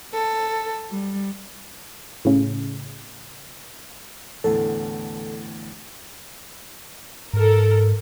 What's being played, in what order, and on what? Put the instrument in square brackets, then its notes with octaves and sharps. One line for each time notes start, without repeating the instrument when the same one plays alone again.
[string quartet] A4
G3
[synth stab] A2 C#3
[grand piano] E2 A2 D3 [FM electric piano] A4
[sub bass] G#2 [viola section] A4 A#4